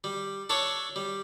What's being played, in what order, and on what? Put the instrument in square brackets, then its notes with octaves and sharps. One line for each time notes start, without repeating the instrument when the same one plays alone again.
[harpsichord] G3
D4 A4 C#5
G3